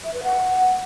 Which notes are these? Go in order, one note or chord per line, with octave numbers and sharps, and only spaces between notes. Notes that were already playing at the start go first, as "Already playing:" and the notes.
E5
B4
F#5